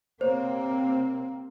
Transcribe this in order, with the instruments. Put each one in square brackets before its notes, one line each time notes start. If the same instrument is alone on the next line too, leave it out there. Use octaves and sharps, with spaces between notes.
[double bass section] C3 A#3 C4 [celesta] C5 C#5